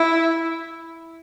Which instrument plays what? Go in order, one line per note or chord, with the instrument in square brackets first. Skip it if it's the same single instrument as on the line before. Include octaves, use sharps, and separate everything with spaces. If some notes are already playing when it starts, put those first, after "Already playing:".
Already playing: [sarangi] E4